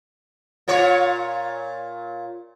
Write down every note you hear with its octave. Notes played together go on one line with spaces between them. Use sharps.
A#2 F4 C#5